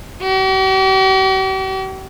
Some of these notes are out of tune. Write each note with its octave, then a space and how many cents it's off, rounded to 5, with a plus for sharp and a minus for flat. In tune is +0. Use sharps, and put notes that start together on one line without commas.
G4 -45